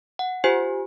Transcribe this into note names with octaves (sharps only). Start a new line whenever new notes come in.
F#5
F4 G4 C5 G#5